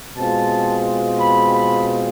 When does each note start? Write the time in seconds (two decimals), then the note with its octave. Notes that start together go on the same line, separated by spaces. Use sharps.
0.16 B2 G#3 C4 F4 A5
1.20 B5
1.54 B5